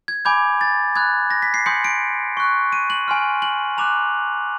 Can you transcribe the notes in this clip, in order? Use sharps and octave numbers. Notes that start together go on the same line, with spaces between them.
G#6
G#5 B5 D6 G6 G#6
A6
B5 D#6 F#6 G#6
A#6
B6
C7
G#5 C6 D#6 G6 C#7
D7
C#6 F#6
D#7
F#7
G#5 C6 F6
F#7
A#5 D6 F#6 F7